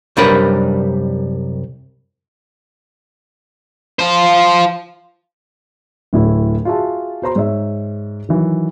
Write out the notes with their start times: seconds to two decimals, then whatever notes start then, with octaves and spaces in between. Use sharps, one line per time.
0.17 C2 F#2 G3 D4 A#4 B4
3.99 F4 C5
6.13 D1 A2 E4
6.65 F4 F#4 G#4 E5 A5
7.22 F#4 C5 A#5 C6
7.36 G#2 C#5 E5
8.29 D#3 E3 F#3